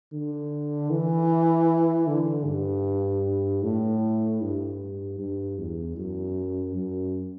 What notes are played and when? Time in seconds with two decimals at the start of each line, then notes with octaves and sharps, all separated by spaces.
0.13 D3
0.90 E3
2.07 D3
2.46 G2
3.63 A2
4.42 G2
5.19 G2
5.59 E2
5.97 F#2
6.75 F#2